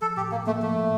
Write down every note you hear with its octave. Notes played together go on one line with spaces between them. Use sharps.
F3 A4
A2 G4
A2 A#3
A3 A#3
F3 A3
A2